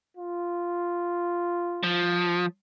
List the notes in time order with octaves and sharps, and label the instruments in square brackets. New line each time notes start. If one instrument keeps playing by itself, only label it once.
[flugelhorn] F4
[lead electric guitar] F3